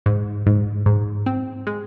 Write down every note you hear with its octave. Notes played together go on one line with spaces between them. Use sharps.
G#2
G#2
G#2
C4
G#3